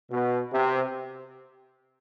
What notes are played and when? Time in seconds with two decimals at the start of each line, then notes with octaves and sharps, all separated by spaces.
0.11 B2
0.53 C3